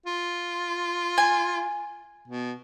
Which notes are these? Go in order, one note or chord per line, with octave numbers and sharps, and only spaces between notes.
F4
G#5
B2